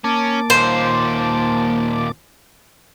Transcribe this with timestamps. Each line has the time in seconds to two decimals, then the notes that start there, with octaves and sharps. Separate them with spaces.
0.04 A#3 C#4 A5 D6
0.50 D#2 A#2 C5